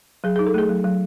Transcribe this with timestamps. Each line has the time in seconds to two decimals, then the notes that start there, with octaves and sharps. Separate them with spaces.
0.24 F#3 G#4
0.36 D#4 G#4
0.46 A4
0.54 A3 G#4
0.69 F#3
0.84 F#3